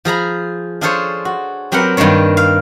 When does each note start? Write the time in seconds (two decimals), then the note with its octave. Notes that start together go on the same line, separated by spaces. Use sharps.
0.05 F3 G#4 A#5 B5
0.81 D4 F4 G#4 A4 C5 C#5
1.25 F#4
1.72 F#3 C4 G4 A#4 B4 F#5
1.97 G2 D#3 A#3 D4 C#5
2.37 F5